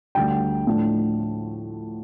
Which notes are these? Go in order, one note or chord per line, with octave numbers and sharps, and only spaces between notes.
D2 D3 G3 G5
A2 F3 A3 D4